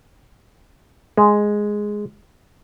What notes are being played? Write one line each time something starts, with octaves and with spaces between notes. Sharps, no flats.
G#3